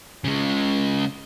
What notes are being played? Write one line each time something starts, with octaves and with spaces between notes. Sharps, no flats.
C#3 G#3